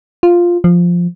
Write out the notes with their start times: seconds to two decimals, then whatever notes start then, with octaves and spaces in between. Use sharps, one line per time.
0.23 F4
0.64 F3